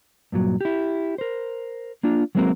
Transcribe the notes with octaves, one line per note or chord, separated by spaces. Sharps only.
G2 A#2 F#3
E4 G4
A#4 C5
A#3 D4 F4
F#3 G#3 A#3 C4 F#4 A#4